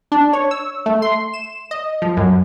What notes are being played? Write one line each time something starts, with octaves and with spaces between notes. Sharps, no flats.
D4
C#5
E6
A3
C6
E7
D#5
F3
F#2